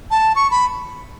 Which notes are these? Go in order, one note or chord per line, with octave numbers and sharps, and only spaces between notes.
A5
C#6
B5